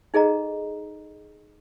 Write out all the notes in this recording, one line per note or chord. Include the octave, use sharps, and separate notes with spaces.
D#4 G#4 A4 D#5 A#5